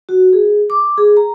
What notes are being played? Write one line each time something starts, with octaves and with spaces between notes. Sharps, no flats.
F#4
G#4
D6
G#4
A#5